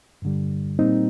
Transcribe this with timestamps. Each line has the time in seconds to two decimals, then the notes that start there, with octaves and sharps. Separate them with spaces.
0.22 G2 D3 G3
0.79 A#2 G3 A#3 C4 D#4